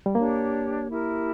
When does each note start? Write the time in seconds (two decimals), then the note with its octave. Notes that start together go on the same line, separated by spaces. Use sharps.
0.06 G3
0.15 A#3 D4 G4 C#5
0.90 E4 G4 A#4